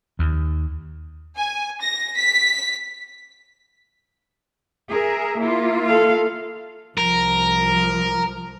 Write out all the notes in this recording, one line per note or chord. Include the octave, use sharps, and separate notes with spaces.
D#2
G#5
A#6
B6
G#4 A#4 E5
A#3 E4 F4
A4 F5
C2 F3 A#4